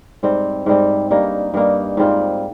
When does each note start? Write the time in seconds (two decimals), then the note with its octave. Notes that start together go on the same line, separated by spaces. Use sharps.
0.23 G#2 G3 C4
0.66 G#2 G3 C4
1.11 G2 G3 A#3 D#4
1.54 G2 G3 A#3 D#4
1.97 G#2 G3 C4 F4